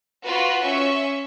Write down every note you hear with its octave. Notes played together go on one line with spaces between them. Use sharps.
F4 F#4 B4
C#4 E5 C#6